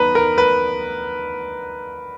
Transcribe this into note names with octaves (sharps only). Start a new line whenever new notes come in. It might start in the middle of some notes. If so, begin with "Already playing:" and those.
Already playing: B3 D#4 B4 A#5
A#4
B4